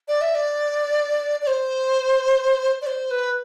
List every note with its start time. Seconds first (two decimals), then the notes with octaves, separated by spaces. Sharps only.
0.08 D5
0.21 E5
0.35 D5
1.42 D5
1.47 C5
2.81 D5
2.87 C5
3.11 B4